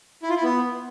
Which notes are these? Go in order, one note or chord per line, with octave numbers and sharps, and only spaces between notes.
E4
F4
E4
B3